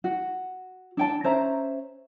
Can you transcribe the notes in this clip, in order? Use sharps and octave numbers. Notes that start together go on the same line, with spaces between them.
F#4
D4 G5 A5
C#4 C5 E5 A#5